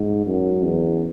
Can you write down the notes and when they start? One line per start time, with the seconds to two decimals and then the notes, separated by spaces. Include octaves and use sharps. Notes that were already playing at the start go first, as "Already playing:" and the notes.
Already playing: G#2
0.26 F#2
0.63 E2